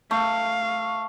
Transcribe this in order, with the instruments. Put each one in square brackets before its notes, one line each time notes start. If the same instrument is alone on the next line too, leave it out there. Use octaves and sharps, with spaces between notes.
[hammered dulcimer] A3 [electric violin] F5